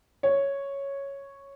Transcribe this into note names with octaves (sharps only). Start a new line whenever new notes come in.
C#5